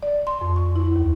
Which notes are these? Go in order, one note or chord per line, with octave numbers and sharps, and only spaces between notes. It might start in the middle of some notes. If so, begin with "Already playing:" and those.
D5
C6
F2
C#6
E4
D#2